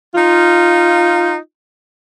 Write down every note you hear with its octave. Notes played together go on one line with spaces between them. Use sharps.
D#4 F4